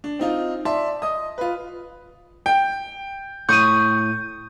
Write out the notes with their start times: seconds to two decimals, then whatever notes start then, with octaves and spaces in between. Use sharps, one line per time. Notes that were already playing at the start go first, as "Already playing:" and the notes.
0.04 D4
0.19 C4 D#4 F4
0.65 D5 E5 A5 C6
1.02 D#5 D#6
1.38 F4 B4
2.46 G5
3.49 A2 C#6 D#6 G6 D#7